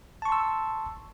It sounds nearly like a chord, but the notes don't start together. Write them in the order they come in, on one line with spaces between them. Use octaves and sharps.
A5 C#6 C6 E6